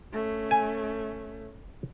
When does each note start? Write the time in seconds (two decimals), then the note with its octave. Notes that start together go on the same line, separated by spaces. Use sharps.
0.13 A3 C#4
0.51 G#5